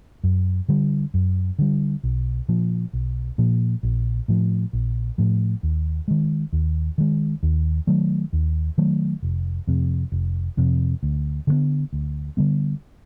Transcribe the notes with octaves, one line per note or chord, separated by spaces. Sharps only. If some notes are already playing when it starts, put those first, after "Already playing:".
F#2
D3 G3
F#2
D3 G3
B1
A#2 F3
B1
A#2 F3
A#1
A2 F3
A#1
A2 F3
D#2
D#3 G#3
D#2
D#3 G#3
D#2
D#3 F#3 A3
D#2
D#3 F#3 A3
F1
F2 C3
F1
F2 C3
D2
D3 G3 B3
D2
D3 G3 B3